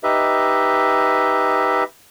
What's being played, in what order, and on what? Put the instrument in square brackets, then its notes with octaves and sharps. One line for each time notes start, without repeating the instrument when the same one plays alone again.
[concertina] D#4 G4 B4 D#5 E5